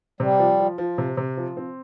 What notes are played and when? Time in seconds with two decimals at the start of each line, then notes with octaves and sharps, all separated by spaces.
0.20 C3 G3
0.39 F3
0.60 F3
0.78 F3
0.98 C3
1.17 C3
1.37 F3
1.57 C4